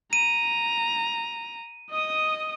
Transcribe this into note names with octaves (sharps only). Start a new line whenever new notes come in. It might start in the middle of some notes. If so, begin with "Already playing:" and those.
A#5 D#7
D#5 D#6